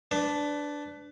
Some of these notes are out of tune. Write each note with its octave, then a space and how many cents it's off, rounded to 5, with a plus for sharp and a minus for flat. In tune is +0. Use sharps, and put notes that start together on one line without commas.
D4 -5 B4 +25